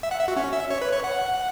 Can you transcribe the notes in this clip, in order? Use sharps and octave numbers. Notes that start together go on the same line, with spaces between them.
E5
F#5
E5
F#4
C#4
E5
C#5
B4
C#5
F#5